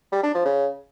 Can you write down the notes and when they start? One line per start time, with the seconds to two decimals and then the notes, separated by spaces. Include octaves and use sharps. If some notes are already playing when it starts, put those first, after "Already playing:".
0.12 G3
0.23 D4
0.34 F3
0.45 C#3